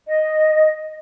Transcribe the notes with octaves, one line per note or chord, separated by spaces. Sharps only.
D#5